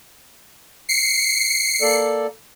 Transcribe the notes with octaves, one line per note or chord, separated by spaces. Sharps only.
C7 C#7
A#3 A4 D5